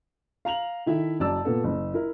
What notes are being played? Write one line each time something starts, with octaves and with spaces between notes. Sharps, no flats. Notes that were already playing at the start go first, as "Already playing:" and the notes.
F5 A#5 F7 F#7
D#3 E4 A4 E5
F#1 F#2 D5 A5 E6
A#2 B3 A4
F#1
E4 A#4